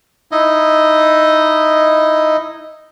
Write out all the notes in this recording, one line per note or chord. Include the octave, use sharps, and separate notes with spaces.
D#4 E4 D#5